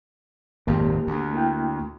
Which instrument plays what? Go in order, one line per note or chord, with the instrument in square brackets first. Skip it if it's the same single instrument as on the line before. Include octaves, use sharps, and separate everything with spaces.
[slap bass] G#1 F2 A#2 [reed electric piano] A#3 G4
[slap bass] D2
[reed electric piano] A#3 E4 G5